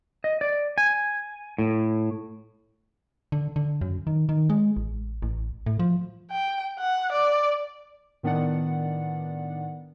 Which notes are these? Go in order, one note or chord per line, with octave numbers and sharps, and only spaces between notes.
D#5
D5
G#5
A2
D3
D3
F#2
D#3
D#3
G#3
A1
A1
A2
F3
G5
F#5
D5
A2 D#3 B3 D4 D5 F#5